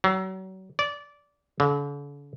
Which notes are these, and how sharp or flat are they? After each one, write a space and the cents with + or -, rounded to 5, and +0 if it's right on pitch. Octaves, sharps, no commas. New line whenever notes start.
F#3 +35
D5 -15
D3 -45